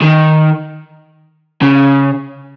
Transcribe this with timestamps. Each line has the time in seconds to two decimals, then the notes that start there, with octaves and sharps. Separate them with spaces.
0.02 D#3
1.62 C#3